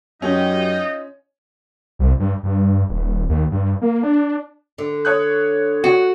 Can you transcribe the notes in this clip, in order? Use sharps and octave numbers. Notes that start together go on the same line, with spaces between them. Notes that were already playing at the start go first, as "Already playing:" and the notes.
F#2 C#4 D#4 F4 G4 D#5
C2
G2
G2
D#1
D#2
G2
A#3
D4
D3
C#5 D#6 F#6
F#4